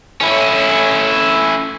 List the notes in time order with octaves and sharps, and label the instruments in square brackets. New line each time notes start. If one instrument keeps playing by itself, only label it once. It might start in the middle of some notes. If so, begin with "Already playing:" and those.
[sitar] A2 [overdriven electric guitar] C#4 E4